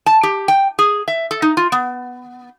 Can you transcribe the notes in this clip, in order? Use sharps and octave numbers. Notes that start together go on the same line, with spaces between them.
A5
G4
G5
G#4
E5
A4
D#4
F4
B3